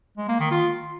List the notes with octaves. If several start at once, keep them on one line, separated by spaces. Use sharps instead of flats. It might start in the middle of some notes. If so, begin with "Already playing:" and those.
G#3
A#3
D#3
F4